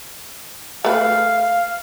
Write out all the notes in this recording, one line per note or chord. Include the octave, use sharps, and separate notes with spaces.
A3 B4 F5